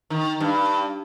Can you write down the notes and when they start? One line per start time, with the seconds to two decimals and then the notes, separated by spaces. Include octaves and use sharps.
0.10 D#3
0.40 G2